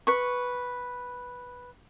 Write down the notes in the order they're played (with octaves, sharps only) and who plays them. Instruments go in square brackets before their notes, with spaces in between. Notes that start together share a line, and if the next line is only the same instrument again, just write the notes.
[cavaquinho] B4 C#6